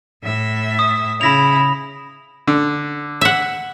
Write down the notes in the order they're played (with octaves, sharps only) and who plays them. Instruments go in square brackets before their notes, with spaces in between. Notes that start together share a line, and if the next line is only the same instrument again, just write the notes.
[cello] A2 E5
[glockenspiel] D#6
[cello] C#3 E4 [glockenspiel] B5 A#6 F7
[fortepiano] D3
[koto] E5 F#5